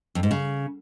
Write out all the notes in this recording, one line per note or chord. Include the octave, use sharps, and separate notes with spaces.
F2
G#2
C#3